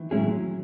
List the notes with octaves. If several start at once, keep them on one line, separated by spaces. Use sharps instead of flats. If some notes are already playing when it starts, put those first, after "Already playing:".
Already playing: D#3 E3
A2 F#3 G#3 C#4 E4 G#4